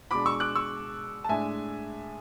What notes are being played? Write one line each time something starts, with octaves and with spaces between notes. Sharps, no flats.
B2 G#3 D4 B5 D6
C#6 E6
D6 F#6
C#6 E6
A5
A2 G#3 D4 E5 G#5